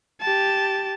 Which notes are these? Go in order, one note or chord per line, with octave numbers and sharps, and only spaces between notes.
G4 A5